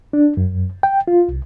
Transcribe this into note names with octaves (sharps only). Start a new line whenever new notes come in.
D4
F#2
G5
F4
C2